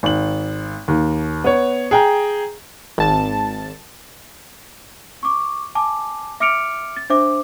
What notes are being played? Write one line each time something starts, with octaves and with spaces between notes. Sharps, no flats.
G#1 F#7
D#2
B3 C#5
G#4 G5 A#5
G#1 A5 A6
C#6 D6
G#5 A5 D6
E5 D6 F6 C#7 D7 F7
A6
D4 C5 E5 D6